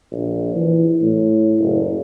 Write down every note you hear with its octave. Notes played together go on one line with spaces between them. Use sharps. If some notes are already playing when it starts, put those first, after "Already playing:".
A#1
E3
A2
F#1